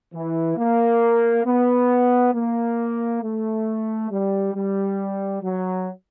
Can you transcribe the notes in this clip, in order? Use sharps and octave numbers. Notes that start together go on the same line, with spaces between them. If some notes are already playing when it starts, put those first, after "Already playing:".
E3
A#3
B3
A#3
A3
G3
G3
F#3